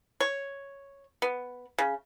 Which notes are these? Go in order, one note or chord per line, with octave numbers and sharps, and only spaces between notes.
C#5
B3
C#3